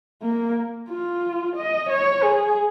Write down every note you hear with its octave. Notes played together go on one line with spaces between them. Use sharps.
A#3
F4
D#5
C#5
G#4